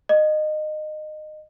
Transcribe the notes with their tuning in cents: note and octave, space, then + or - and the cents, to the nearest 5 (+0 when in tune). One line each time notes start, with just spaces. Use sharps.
D#5 -20